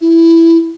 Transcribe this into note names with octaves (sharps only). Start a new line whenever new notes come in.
E4